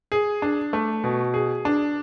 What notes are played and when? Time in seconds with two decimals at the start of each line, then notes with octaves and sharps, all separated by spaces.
0.12 G#4
0.42 D4
0.73 A3
1.04 B2
1.34 G#4
1.65 D4